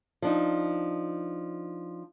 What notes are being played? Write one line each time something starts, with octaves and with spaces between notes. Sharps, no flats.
F3 D4 D#4